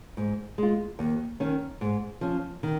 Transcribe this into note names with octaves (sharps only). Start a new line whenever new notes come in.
G#2
G#3 F4
D#2
D#3 C#4
G#2
F3 C#4
D#3